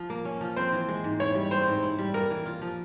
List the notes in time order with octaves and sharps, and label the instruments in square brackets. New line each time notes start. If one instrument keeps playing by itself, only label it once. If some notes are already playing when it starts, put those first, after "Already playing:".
Already playing: [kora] F3
A#3
C#4
F3
[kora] C4 [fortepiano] C5
[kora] E3
G#3
G#2
[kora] E4 [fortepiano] C#5
[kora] G3
[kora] C4 [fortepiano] C5
[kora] G#2
E4
G3
[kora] A#3 [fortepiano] A#4
[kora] E3
F4
F3